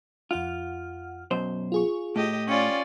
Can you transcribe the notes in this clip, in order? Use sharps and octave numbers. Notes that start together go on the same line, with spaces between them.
F2 F4 F#5 F6
F#2 B2 C5
F4 G#4 C#6
A2 G4 D#5
C#4 F4 D5 G5